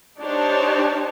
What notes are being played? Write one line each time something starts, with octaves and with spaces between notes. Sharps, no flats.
D4 D#4 G4 C5 C#5 A5